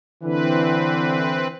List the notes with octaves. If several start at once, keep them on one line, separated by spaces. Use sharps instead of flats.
D3 E3 C4 B4